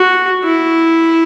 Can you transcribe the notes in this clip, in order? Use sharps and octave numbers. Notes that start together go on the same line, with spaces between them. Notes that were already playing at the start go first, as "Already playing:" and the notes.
Already playing: F#4
E4